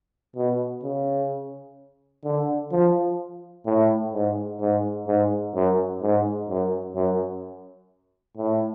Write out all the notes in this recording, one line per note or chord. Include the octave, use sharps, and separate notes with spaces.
B2
C#3
D3
F3
A2
G#2
G#2
G#2
F#2
G#2
F#2
F#2
A2